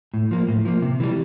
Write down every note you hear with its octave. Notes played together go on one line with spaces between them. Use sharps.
A2
F3 A#3
A2
F3 A#3
C3
E3 G3